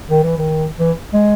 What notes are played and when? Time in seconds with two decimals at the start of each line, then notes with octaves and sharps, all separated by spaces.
0.10 D#3
0.23 E3
0.38 D#3
0.79 E3
1.14 G#3